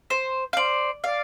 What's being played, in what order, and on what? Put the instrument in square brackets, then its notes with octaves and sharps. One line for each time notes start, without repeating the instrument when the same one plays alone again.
[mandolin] C5
F5
[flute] C5 [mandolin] D5
[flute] D5 [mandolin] F5